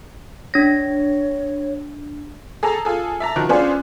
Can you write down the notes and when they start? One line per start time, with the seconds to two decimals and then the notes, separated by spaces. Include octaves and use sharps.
0.54 D4 C#5 A#6
2.63 G#4 A4 A5 A#5
2.85 F4 G#4 A4
3.20 E5 A5 A#5
3.36 D#3 F3 F#4
3.49 B3 C#4 D4 F4 G#4 C5